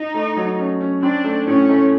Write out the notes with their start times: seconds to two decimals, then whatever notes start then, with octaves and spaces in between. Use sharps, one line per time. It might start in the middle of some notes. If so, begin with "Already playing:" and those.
Already playing: D#4
0.14 A3
0.37 F#3
0.59 C#4
0.81 C#4
1.03 C4 D4
1.24 A3
1.47 A2 C#4
1.69 A3